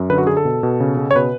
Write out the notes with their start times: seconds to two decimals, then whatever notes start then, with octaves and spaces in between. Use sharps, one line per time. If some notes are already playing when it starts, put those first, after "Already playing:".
Already playing: F#2
0.10 D3 B4
0.18 F#4
0.27 D3 G#4
0.37 A4
0.45 B2
0.63 B2
0.80 C#3
0.97 C#3
1.11 C#5
1.15 B2 B4